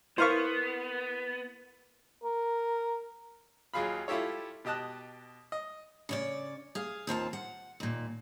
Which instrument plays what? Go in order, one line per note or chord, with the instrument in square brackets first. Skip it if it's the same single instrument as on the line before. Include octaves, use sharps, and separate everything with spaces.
[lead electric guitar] B3 [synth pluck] E4 A#4 [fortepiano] C5 F5 C#6
[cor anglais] A#4
[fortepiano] D#2 F#3 F4 G#4 F5 B5
E4 F4 G4 A4 C#5
B2 G4 D#5 A5 F#6
D#5
[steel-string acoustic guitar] C#3 C#5 D5
G#4 F5
D#2 C4 F4 A5
F#5
D#2 A#2